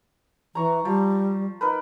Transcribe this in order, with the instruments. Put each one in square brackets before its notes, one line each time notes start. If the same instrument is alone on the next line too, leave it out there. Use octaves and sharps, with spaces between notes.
[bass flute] E3 [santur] A#5 C#6
[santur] F3 [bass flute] G3
[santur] D#4 A#4 B4